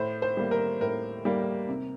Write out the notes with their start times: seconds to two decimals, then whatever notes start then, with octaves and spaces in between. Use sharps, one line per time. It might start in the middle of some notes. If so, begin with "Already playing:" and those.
Already playing: A2 C5
0.22 C5
0.37 G3 A#3
0.51 A#4
0.81 A2 A#4
1.25 G3 A#3
1.69 C3